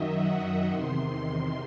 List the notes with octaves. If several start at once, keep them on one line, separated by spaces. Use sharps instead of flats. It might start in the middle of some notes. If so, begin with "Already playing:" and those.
Already playing: F#2 D#3 F#3 D#5 E5
F#5
E2 C3 D#3 C6
C6
C6